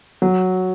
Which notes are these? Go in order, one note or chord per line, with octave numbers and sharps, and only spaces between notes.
F#3